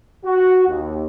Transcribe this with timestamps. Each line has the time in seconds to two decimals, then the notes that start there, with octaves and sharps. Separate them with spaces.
0.25 F#4
0.68 D#2